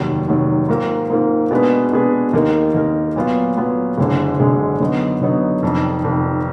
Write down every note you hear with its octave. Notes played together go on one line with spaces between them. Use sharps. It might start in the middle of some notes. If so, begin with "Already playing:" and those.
Already playing: F1 D#2 D#3 F#3
F1 D#2 D#3 F#3
G#2 D#3 A#3 F4 A#4
G#2 D#3 A#3 F4 A#4
B2 G#3 D4 G#4 B4
B2 G#3 D4 G#4 B4
D#2 D#3 A#3 D#4 A#4
D#2 D#3 A#3 D#4 A#4
A#2 F#3 B3 F4
A#2 F#3 B3 F4
F#1 F#2 D3 G#3
F#1 F#2 D3 G#3
D3 F#3 B3 D#4
D3 F#3 B3 D#4
F1 F2 D#3
F1 F2 D#3